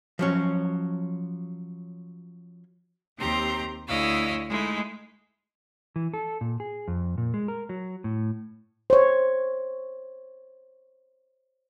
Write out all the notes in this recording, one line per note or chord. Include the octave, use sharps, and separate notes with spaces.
F3 F#3 C#4
D#2 C4 G4 A#5 C6
D2 E4 C#5 D#5 F5 E6
G#3 A3 D#4 E4
E3
A4
A#2
G#4
F2
A#2
G#3
A#4
F#3
A2
C5 C#5